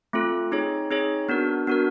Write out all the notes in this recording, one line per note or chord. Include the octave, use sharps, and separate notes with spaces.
A3 C4 F4 A4
C4 D#4 G#4 C#5
C4 D#4 G#4 C#5
B3 D4 F#4 A#4
B3 D4 F#4 A#4